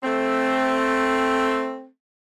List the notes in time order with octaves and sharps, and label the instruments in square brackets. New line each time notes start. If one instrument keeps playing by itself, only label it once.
[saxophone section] A3 C4